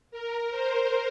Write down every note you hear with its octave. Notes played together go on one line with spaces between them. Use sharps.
A#4
C5